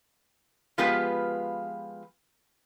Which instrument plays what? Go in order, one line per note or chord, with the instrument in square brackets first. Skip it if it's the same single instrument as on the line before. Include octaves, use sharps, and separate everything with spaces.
[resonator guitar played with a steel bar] F3 G#3 B3 F4 G4 B4